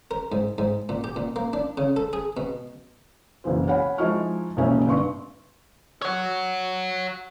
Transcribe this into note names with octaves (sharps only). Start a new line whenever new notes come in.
A#4
G#2
G#2
A#2
G4
A#2
A#3
D4
C#3
A4
G#4
B2
F#1 B1 E3 C5
C#5 F5 F#5 G#5 B5
F3 G#3 D#4 E4 C#6 F6
E1 B1 A#2 C#4 E5
G1 G2 C6 C#6
C#5 F#5